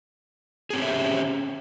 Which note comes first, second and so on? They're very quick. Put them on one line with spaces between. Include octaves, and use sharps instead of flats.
G#4 C4 G4 C#4 E5